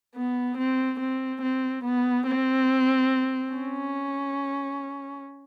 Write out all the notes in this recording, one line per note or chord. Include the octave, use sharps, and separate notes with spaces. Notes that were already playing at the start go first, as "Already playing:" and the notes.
B3
C4
C4
C4
B3
C4
C#4